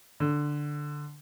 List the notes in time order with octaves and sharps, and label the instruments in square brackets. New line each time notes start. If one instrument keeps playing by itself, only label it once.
[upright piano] D3